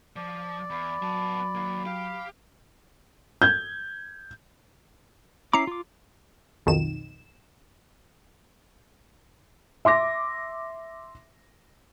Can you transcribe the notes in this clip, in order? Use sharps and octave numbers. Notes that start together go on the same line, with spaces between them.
F3 D5
E2 B5
F#3 B3 A5
A#3 D#4
G4 F5
G6 G#6
C#4 E4 A#5 D6 C7
F4 D6
B1 F2 D#3 E7
E5 C6 D6 A#6